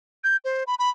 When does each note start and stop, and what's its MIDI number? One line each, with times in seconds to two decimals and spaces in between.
0.24 0.37 91
0.45 0.63 72
0.67 0.75 83
0.79 0.89 83